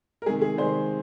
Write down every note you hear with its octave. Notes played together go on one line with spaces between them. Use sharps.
A#4
C3 D#3 G#3 G#4
G#4
C3 D#3 G#3 C5